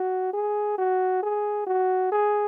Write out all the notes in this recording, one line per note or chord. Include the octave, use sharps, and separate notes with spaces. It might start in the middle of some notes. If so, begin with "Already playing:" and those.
Already playing: F#4
G#4
F#4
G#4
F#4
G#4